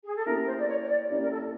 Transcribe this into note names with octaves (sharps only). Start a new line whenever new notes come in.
G#4
A4
A#3 C#4 E4 G4 A#4
C5
D5
C#5
C#5
D5
A#3 C#4 E4 G4 D5
A#4
A4